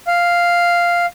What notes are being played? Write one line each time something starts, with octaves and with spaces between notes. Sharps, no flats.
F5